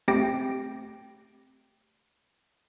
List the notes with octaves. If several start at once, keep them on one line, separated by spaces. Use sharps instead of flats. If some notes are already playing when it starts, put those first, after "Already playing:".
A3 C4 G4 G5 A#6